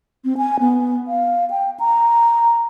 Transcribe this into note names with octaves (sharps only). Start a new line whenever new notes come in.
C4
G#5
B3
F5
G5
A#5